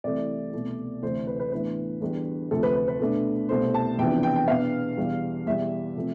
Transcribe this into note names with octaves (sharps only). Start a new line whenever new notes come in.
C2 C3 E3 A3 D5
C2 B2 A3
D2 C3 E3 C5
B4
B4
A2 E3 B3 D4 B4
E2 D3 G3 B3
D2 C3 F3 A4
B4
B4
B4
B2 A3 D4
C2 B2 A3 C4 C5
A5
E2 C3 F3 B3 D4 G5
G5
G5
B2 B3 D4 F5
E2 B2 G3
E2 B2 G3 E5
C3 F3 A3 C4